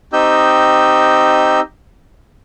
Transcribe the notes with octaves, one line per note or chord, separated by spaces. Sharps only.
C4 D#4 G4 D#5 E6 G6